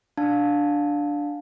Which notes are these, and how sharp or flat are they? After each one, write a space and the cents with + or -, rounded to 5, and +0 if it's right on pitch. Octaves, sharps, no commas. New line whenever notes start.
D4 +0 F5 +20 A5 +0